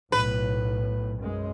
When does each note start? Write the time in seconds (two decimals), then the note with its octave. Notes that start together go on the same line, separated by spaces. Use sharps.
0.12 B1 A2 B4
1.20 F#2 G#3